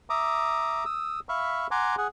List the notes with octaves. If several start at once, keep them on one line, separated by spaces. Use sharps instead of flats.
E5 A#5 D6 D#6
D#6 E6
E5 F5 B5 C#6
F#5 G#5 A#5 C6 D6
G#4 F#5